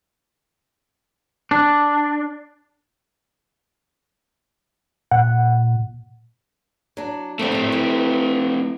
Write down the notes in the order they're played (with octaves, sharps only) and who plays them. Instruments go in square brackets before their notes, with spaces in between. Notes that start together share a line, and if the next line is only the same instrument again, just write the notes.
[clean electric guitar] D4
[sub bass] A#2 [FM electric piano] F#5
[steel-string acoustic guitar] F#3 D4
[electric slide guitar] A3 C4 [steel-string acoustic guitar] A#3 D4
[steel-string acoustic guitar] A2 F#3
E3